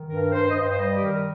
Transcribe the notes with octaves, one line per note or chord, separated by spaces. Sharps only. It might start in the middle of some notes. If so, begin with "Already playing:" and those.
Already playing: D#3
G2 A#4
G2 C5
D#5
G2 C5
C5
G3 D#5
G4
D#3 A#4